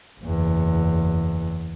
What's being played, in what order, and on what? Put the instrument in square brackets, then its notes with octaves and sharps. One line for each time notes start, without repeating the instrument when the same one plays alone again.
[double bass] F#1 E2